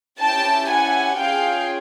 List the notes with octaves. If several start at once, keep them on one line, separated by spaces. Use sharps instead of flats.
C#4 E4 G4 G5 A5
F#5 G#5
C#4 F4 G#4 F5 G5